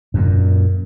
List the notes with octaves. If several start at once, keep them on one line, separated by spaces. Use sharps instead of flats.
F#2 A#2